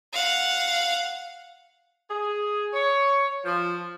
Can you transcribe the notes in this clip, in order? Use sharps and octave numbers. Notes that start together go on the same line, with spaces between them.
F5 F#5
G#4
C#5
F3